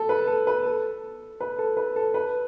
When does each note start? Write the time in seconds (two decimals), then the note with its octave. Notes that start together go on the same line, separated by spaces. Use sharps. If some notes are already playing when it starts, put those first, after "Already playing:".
Already playing: A4
0.09 B4
0.27 A4
0.47 B4
0.66 A4
1.40 B4
1.59 A4
1.77 B4
1.96 A4
2.14 B4